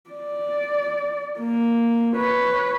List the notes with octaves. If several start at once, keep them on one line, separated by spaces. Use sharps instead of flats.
D5
A#3
B4 C#5